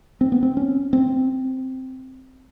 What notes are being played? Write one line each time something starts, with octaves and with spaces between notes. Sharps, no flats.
C4
B3
C4
C#4
C4